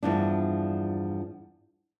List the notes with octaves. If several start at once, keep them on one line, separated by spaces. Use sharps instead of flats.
E2 G2 F3 D4